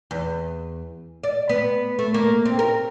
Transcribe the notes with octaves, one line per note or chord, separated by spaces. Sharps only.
E2
D5
B3
A3
A#3
C4
A#4